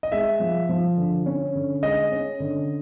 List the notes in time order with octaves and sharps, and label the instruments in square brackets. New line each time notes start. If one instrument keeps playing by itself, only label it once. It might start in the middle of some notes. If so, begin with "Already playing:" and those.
[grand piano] D#5
[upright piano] G#3 [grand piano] E5
[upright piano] F3
F3
D3
C#4
D3
[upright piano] G#3 [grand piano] D#5
[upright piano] C#4
D3